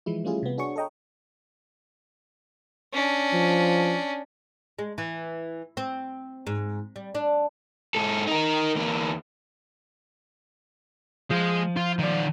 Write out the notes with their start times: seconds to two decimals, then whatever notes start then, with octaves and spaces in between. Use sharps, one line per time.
0.06 E3 F3 G#3 E4
0.24 G3 A3 C#4 E4 F4 G#4
0.43 C3 B3
0.58 D4 F#4 G#4 C#5 C#6
0.76 A4 C#5 D#5 G5 A#5
2.93 C#4 D4
3.33 F3
4.79 G#3
4.98 E3
5.77 C4
6.47 G#2
6.96 G3
7.15 D4
7.95 G#2 A4
8.27 D#4 A#4
8.76 E2 A#3
11.31 F3 G#3
11.77 F4
11.99 D#3 D5